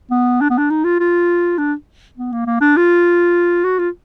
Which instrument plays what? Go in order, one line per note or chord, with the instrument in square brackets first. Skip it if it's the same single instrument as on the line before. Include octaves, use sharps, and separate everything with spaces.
[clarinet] B3
D4
B3
D4
D#4
F4
F4
D4
B3
A#3
A#3
D4
F4
F#4
F4